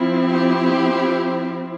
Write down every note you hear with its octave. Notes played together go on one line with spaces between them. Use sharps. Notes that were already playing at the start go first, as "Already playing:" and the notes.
Already playing: F3 C4 E4
G4